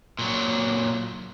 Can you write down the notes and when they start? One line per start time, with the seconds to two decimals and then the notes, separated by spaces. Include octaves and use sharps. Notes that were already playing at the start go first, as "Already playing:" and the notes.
0.19 A#2 F#3